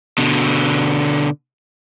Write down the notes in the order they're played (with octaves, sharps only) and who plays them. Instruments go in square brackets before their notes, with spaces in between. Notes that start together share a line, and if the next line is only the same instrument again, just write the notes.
[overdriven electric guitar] B2 D3